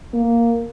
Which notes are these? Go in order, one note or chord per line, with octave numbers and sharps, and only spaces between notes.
A#3